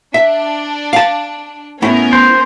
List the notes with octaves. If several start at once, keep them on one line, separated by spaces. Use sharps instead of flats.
D4 E5
F5 A5
A3 B3 C#4 E4 A#4
C5